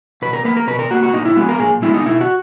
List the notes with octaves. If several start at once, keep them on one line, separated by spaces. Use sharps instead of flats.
B2 B4
A#4
A#3 B4
A#4
B2 B4
A#4
A#3 F#4
F#4
A#2 D#4
E4
G#3 B3 F#4
A#4
A#2 G#4
G#3 B3 E4
D#4
B2 E4
F#4